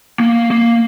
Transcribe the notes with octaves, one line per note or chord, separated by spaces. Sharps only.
A#3
A#3